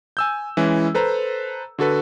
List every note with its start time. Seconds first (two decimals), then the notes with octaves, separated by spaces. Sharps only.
0.17 G#5 E6 G6
0.57 E3 G#3 C#4 E4
0.95 A4 B4 C5 A#5
1.79 D3 F#4 A4 B4